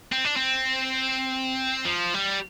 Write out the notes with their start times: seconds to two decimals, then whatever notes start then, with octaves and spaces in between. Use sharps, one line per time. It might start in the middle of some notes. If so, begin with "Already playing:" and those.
0.12 C4
0.24 D4
0.36 C4
1.85 F3
2.14 G3